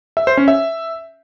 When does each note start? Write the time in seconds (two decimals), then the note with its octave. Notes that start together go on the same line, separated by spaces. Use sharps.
0.17 E5
0.27 C5
0.37 C#4
0.48 E5